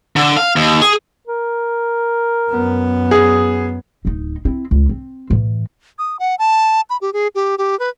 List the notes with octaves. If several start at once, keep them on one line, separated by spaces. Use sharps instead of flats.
D3
F5
D#2
G#4
A#4
F#2 B3
G#4
D1 D#4
C4 E4
C#2
C4
A2 E3
D#6
F#5
A5
B5
G4
G#4
G4
G4
B4